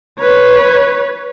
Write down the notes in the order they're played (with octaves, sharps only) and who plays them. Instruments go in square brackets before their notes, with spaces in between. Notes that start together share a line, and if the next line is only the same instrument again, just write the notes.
[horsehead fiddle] B4 C#5